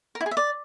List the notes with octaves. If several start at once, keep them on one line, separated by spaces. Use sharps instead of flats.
A#4
E4
G#4
E5
D5